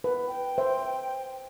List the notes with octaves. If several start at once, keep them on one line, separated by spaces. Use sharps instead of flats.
B4
G5
C5 E5